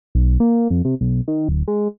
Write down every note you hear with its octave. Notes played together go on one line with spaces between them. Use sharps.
B1
A#3
F2
C3
B1
D#3
D1
G#3